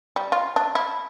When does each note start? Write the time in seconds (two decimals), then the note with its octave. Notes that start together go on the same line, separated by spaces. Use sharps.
0.16 G3
0.32 F4
0.56 D4
0.75 E4